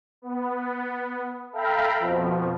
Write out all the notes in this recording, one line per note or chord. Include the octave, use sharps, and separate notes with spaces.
B3
A4 E5 F5 G5 A#5 B5
F2 B2 F3